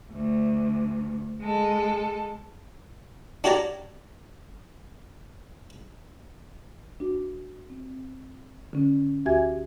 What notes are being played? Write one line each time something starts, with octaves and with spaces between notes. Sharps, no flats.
D2
G#3 A4
D4 F#4 G4 C#5 D5 A#5
D4 F#4
C4
D3 C#4
D2 F#4 G4 E5 G#5 G#6